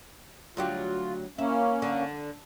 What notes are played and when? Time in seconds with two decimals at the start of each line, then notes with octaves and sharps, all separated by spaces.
0.57 D2 F#3 F4 G4
1.38 A#3 C#4 E4
1.82 D3